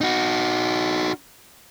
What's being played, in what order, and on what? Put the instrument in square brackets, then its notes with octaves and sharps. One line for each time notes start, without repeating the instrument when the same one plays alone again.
[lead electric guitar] D#4 F#4